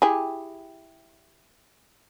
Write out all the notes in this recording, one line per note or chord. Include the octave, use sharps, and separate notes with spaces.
E4 G4 G#4